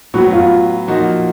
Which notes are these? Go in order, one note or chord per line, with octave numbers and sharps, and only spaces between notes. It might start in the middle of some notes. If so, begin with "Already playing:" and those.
A2 F#3 B3 F#4
F4
A#2 F3 A#3 D#4 F#4